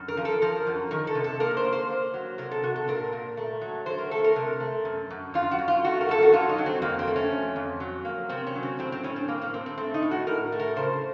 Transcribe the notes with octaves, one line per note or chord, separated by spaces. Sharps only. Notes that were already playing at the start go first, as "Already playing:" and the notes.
Already playing: F#2
A#4
F3
A4
F3 A#4
F#2
D#3 A#4
A4
C3
A4
A#3 A#4
C5
A#3
C5
A#3
F#3
C3 A#4
A4
C3 F#4
A4
A#2 A#4
A#2
A3
F#3
A3 C5
A#4
A3 A4
A#4
C3
A3
F#2
F#2
F#2 F4
F#4
F#2
F4
A3 F#4
A#4
F#2 A4
F#4
F#3 F4
D#4
F#3
C4
F2 A#3
C4
A3
C#4
F2
F2
F#3
A#3
C3 C4
C#4
F#3
C4
A2 C4
C4
A2 C#4
C4
A2 A#3
A#3
A2 C4
C4
A3 C4
D#4
A2
F#4
A2 A#4
A3
A#4
C#3 C5